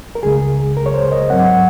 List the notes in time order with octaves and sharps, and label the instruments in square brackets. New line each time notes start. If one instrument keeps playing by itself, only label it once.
[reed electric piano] A#4
C#2 C#3 G#3 G#4
A#4
C#5
C5
D#5
G#2 F#3 C4 F#5